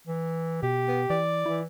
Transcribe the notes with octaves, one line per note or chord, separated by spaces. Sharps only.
E3
B2 G4
B3
E3 D5
E3 E4